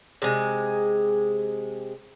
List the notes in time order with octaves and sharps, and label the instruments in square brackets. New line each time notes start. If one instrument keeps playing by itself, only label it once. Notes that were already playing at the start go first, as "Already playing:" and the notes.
[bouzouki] C3 G#3